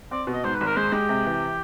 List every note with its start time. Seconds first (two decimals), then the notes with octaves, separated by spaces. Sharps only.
0.11 C4 D5
0.27 B2
0.33 D#5
0.44 G#2 C5
0.55 B4
0.61 G#1
0.66 A#4
0.77 G#3 C5
0.92 G#3 G4
1.09 C3
1.26 E3